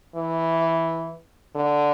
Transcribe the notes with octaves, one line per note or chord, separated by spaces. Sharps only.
E3
D3